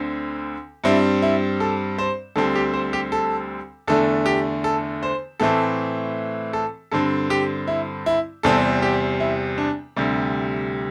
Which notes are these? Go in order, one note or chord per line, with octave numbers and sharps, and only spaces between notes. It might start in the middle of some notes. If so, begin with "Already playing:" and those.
Already playing: D2 D3 C4
G2 G3 C4 E4
E4
A4
C5
D2 D3 G3 C4 A4
G4
C5
G4
A4
E2 D3 A3 A4
G4
A4
C5
A2 E3 A3 C4 A4
A4
G2 D3 C4 A4
G4
E4
E4
E2 C3 G3 C4 A4
G4
E4
D4
D2 C3 G3